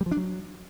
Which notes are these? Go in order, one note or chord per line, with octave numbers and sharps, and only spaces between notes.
G3
F3
D4
F#3